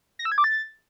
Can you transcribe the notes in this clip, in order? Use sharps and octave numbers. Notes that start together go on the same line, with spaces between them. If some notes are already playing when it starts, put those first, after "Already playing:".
A#6
E6
G#6
D6
A6